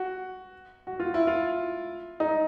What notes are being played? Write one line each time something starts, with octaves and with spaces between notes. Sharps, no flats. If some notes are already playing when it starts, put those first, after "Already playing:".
Already playing: F#4
F#4
F4
E4
F4
D#4